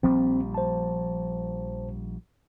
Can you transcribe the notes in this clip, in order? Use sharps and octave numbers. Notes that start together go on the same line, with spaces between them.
A#1 F3 G3 C4
C5 A5